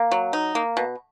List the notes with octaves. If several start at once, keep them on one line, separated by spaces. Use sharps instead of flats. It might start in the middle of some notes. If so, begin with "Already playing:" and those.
Already playing: A#3
F#3
D#4
A#3
B2